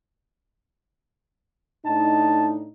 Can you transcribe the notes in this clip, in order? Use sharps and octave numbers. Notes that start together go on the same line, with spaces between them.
A2 D4 D#4 A5